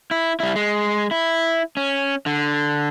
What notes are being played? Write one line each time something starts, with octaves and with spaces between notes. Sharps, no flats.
E4
G3 E4
G#3
E4
C#4
D3